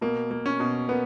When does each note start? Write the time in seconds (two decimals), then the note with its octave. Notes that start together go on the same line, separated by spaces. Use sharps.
0.01 B2 A#3
0.31 A#3
0.46 C#4
0.60 B2
0.89 A#3 B3